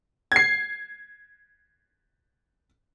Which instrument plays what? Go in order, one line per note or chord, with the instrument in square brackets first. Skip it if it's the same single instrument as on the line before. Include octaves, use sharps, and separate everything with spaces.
[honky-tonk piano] G#6 C7